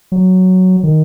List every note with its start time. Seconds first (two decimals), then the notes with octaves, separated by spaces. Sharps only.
0.12 F#3
0.83 D#3